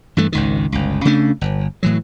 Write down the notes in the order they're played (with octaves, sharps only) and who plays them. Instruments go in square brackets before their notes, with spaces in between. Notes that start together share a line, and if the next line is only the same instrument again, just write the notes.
[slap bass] G2 E3 A3
G#1 C#2 D#3
G1 C#2
C#3 A3 C#4 D4
G1
A2 E3 F#3